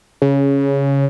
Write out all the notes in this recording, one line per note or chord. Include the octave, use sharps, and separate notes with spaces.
C#3